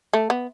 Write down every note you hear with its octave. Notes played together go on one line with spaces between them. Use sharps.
A3
B3